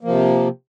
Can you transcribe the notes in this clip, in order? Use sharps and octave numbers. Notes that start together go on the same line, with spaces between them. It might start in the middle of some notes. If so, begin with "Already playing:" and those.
C3 F3 A#3